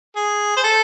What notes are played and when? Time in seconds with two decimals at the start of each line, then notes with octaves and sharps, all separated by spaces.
0.16 G#4
0.57 C5
0.64 A4